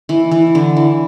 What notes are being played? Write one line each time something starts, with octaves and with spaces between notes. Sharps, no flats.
E3
E3
D3
E3